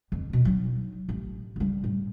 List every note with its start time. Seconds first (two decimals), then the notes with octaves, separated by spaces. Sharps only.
0.12 F2 D3
0.30 D#2 B2
0.45 F#3 D#4
1.09 A1
1.56 C#3 G3
1.84 A2